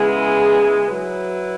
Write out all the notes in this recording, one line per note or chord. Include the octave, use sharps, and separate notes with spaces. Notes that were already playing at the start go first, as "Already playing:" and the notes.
Already playing: C#3 G#3 B3 E4 G#4
F#3 E4 B4